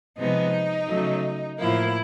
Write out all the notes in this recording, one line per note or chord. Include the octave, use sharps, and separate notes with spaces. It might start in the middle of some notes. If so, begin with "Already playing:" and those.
C3 F3 G#3 B3 D#4
C#3 F#3 A3
A2 F3 A#3 E4